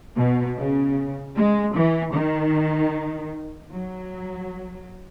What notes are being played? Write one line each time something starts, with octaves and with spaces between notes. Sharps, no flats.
B2
C#3
G#3
E3
D#3
F#3